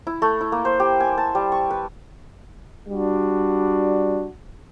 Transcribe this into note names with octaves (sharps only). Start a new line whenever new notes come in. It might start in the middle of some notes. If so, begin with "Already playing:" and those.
E4
A3
E4
A#3
C5
G4
G#5
A5
G3
C#6
B4
G3 D4 F#4